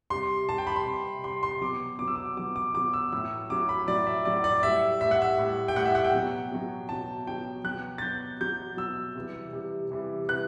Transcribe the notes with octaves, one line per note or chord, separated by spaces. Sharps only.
C3 G3 C6
C3 G3 A5
G5
B5
C6
C3 G3
C3 G3 C6
C6
B2 F#3 D6
B2 F#3 D6
E6
D6
B2 F#3 D6
D6
B2 F#3 D6
E6
A2 F#3 E6
A2 F#3 D6
B5
A2 F#3 D5
E5
A2 F#3 D5
D5
A2 G3 E5
A2 G3 E5
F#5
E5
A2 G3
G5
A2 G3 F#5
E5
F#5
G5
B2 F#3
B2 F#3
B2 F#3 A5
B2 F#3 G5
B2 F#3 F#6
A6
B2 F#3 G6
B2 F#3 G6
B2 F#3 E6
C3 E3 G3
C3 E3 G3
C3 E3 G3
C3 E3 G3 F#6